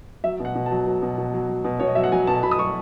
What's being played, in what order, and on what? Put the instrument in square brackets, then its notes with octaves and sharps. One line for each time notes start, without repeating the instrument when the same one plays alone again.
[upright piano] F#3 E5
B2
F#5
B2
A5
F#3
F#3
B2
B2
F#3
F#3
B2
B2 C#5
D#5
F#3 E5
F#5
F#3 G#5
B2 A5
B2 B5
D#6
F#3 C#6